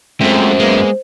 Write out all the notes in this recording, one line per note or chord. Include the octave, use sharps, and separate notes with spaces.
F#2 G#3 A3 C4 F4 C5
G#3 A#3 B3